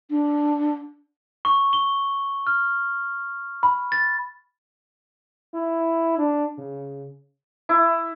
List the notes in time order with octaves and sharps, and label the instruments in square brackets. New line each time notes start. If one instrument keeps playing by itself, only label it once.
[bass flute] D4
[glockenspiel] C#6
G7
F6
B5
A6
[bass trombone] E4
D4
C#3
[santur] E4